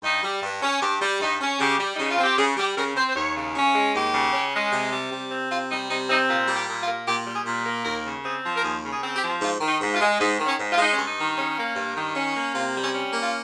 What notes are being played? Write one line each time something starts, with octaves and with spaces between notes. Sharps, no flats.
G2 D#4
G3
G2
C#4
G2 G4
G3
G2 D#4
C#4
C#3 G4
G3
C#3 D#4
F4
C4
G4
C#3 G#4
G3 G4
C#3 A#4
C4 C5
C5
D#2 C#5
C#3
C#4
G#3
D#2 G4
C#3
C#4
G#3
C3
G3
C3
C4
C3 F4
G3 D#4
C3 D#4
C4 D#4
A#2 F4
G3
G4
A#2
F4
A#3
A#2 G4
G3
G#4
A#2
A#3
D#2 A#4
C#3
C4 G#4
F3
A#4
D#2 G#4
C#3
G#4
C4
G4
F3
G#2 F4
D#3
D#4
G#2
F4
G#3
G#2 D#4
D#3
C#4
G#2
F4
G#3 D#4
C#4
G2
D#4
D#3
C#4
A#3
G2
D#3
C#4
A#3
C3 F4
G3
C#4
C#4
A#3
F4